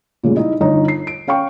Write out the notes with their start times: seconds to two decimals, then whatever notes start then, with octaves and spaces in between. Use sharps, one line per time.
0.23 A#2 C#3 G3 G#3
0.37 D#4 E4 D#5
0.60 G1 D3 D#4 C#5
0.88 C7
1.07 D7
1.27 C#4 F5 G5 C#6